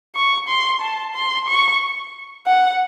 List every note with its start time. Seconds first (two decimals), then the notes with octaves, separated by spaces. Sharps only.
0.15 C#6
0.48 C6
0.81 A5
1.14 C6
1.48 C#6
2.47 F#5